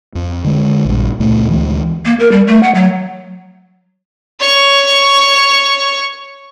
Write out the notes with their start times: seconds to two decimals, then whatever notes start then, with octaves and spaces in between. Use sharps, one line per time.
0.15 F2
0.44 D3 G#3
0.85 A#1 G2
1.19 C#2 A#2 A3
1.49 D2 E3 G#3
2.05 A#3
2.20 A#4
2.32 G3
2.47 A3
2.63 F#5
2.75 F#3
4.40 C#5 C#6